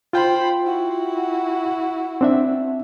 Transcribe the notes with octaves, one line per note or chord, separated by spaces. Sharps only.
F4 C5 G5 B5
E4 F#4
C4 D4 E5